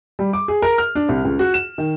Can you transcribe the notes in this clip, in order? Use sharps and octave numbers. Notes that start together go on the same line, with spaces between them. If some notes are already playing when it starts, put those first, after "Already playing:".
G3
D6
G#4
A#4
F6
D4
C2
C#2
F#4
E7
D#3